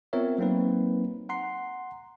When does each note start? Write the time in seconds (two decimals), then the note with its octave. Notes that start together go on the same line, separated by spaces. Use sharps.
0.13 B3 C4 F4 A#4 C#5 E5
0.38 F#3 A#3 C4 D#4 B4
1.29 F#5 A#5 C6 C7